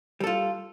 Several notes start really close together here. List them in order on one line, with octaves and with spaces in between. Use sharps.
G3 A4 F4